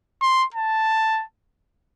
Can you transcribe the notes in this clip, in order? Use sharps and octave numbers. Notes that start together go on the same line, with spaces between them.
C6
A5